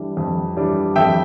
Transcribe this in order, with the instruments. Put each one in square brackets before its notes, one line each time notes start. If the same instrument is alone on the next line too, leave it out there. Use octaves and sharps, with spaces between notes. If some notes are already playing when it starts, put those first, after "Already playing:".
Already playing: [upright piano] E3 G3 D4
F2
E3 G3 D4
F2 E5 G5